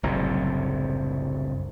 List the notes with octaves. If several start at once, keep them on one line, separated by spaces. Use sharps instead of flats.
F#1 C2 A2 C3